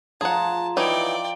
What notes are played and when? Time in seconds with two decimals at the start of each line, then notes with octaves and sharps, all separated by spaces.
0.21 F3 G#4 F#5 A5 A#5
0.77 E3 F#3 D#4 D5 G5